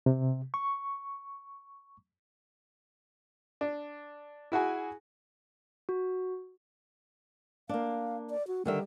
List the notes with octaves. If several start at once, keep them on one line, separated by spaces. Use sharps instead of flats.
C3
C#6
D4
E4 F#4 G#4 G#5
F#4
A#3 D4 F5
D5
F#4
D3 D#3 G3 E5